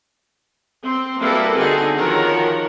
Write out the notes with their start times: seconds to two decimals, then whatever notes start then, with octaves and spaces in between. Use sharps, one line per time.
0.84 C4 C6
1.19 G3 A#3 E4 F#4 A4 B4
1.56 D3 C4 D#4 F#4 G#4
1.96 D#3 F3 F#4 A#4 C#5